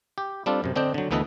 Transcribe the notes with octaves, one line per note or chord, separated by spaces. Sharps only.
G4
G3 C4 D4 F4 A4
F#2 C3
D3 C4 D4 D#5 G5
D3 F#3
D2 E3 B3 A4 B4 D#5